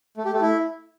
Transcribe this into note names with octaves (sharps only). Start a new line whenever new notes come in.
A3
G4
A3
E4